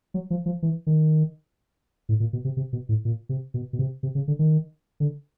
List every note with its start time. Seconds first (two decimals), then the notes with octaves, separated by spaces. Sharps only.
0.14 F#3
0.30 F3
0.46 F3
0.62 E3
0.87 D#3
2.09 A2
2.20 A#2
2.33 B2
2.45 C3
2.57 C3
2.73 B2
2.89 A2
3.05 A#2
3.29 C3
3.54 B2
3.73 B2
3.79 C3
4.03 C3
4.15 C#3
4.28 D3
4.39 D#3
5.00 D3